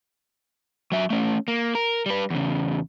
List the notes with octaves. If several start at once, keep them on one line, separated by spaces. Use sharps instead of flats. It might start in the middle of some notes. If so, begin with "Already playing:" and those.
F#3 E5
A3 C#4
A#3
A#4
G3 B4
E2 C#3